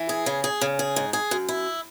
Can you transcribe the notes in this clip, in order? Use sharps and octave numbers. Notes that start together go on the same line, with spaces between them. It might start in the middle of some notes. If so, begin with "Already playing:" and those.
Already playing: E3
G#4
C#3
G#4
C#3
G#4
G#2
G#4
F#2
E4